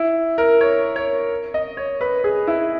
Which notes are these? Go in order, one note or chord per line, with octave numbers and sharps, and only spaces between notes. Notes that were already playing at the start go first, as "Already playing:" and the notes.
Already playing: E4
A#4
C#5
C#5
D#5
C#5
B4
G#4
E4